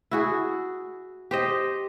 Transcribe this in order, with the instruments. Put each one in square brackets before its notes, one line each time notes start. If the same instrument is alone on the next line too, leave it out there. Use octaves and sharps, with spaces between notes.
[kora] E4 F#4 G#4
G4 C5 D#5